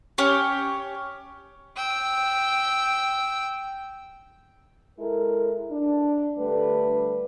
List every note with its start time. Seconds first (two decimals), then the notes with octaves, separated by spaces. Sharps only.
0.18 C#4 G4 C#5
1.76 G5 E6
4.99 G#3 E4 A4 A#4
5.70 D4
6.37 D3 G3 A3 D4 B4